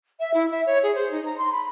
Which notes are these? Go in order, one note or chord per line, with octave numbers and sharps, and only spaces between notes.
E5
E4
E5
C#5
G#4
C5
D#4
A#5
C6
B5